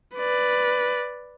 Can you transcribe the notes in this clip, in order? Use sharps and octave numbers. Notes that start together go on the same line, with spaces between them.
B4 D5